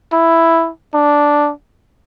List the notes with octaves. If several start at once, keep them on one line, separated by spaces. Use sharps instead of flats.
E4
D4